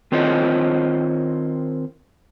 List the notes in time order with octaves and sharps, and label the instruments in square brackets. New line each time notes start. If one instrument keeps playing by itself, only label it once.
[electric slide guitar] D#3 C4 F4 C5 C#5 D#5